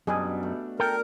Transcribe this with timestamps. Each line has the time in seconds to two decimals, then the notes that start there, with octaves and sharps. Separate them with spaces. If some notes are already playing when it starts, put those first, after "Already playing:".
0.07 F#2 B2 G3 D4 G#4
0.43 A3
0.80 A4 A#4 G5